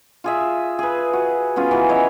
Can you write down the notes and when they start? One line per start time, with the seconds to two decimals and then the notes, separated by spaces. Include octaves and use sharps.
0.24 F4 G#4 E5
0.79 G#4 B4
1.13 F#4
1.56 B3 C#4 F4 G#4
1.71 E3 F#3
1.89 C#5 D#5 E5